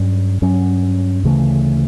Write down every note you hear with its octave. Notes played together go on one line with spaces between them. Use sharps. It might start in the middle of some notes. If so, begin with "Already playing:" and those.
Already playing: G2 F#3 C#4
G2 F#3 C#4
D2 C#3 E3 A3